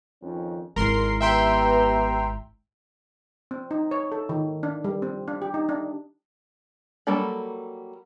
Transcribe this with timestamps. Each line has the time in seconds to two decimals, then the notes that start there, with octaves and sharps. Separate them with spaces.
0.22 F2 D#3 C#4
0.76 G#1 G#3 E4 A#4 C6 C7
1.20 B3 G4 B4 E5 G5 A#5 C6
3.51 C4
3.71 D#4
3.91 C#5
4.12 A4
4.29 D#3
4.63 D4
4.84 G3
5.02 C4
5.28 D4
5.42 G4
5.54 D#4
5.69 D4
7.07 F#3 G3 A#3 A4 B5